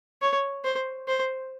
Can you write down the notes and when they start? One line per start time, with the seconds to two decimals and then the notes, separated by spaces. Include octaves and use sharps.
0.22 C#5
0.64 C5
1.08 C5